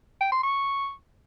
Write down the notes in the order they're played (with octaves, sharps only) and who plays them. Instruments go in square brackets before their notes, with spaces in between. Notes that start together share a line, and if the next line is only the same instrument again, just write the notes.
[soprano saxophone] G5
C6
C#6